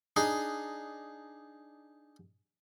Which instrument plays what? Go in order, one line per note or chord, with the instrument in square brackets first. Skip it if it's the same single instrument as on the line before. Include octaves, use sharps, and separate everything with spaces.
[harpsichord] D4 D#4 G#4